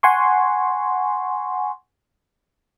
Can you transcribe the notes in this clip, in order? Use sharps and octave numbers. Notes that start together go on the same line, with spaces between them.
F#5 G#5 C6 C#6